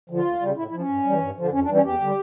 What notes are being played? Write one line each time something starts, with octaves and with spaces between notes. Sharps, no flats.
D3 F3 F4
D2
C#3 G3
A2 E4
E4
F3
C#4
G2
G3
E3
G2
D3 F3
F2 C#4
D4
E3 G3
C#4
E2 G4
D3 G3